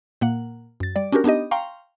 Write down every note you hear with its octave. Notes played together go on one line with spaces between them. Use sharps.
A#2 A#3 F#5
F#2 A6
G3 D5
C#4 D4 F#4 G4 A#4
B3 D4 D#4 G4 D#5
F5 G5 A#5 C6 C#6